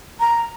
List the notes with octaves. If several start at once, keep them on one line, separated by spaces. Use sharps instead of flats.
A#5